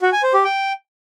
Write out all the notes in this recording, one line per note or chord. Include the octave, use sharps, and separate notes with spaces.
F#4
G#5
C5
G4
G5